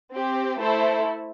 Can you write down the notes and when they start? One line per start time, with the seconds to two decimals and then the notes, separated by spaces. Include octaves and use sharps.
0.14 C4 G4
0.59 A3 E4 A4 C5